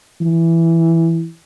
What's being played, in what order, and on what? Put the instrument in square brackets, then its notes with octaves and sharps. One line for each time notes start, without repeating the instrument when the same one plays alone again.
[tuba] E3